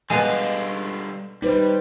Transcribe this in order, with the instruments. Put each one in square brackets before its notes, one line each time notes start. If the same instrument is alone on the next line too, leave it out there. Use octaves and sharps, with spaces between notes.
[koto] B2 G#3 [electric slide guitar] D3 G3 F5
[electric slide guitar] G3 [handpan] D#4 B4 C5